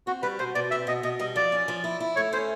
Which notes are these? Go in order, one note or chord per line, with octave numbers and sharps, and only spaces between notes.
C4 F#4
G3 B4
B2 C5
B2 D5
C4 E5
B2 D#5
B2 D#5
G3 D#5
F3 D5
C#4
F3
E4
E4
A3 C#5
C#4 C5